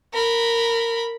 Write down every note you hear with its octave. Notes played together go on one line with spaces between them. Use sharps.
A#4 B5